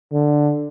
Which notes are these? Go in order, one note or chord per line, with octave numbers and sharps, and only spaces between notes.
D3